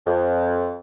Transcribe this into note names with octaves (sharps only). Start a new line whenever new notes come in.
F2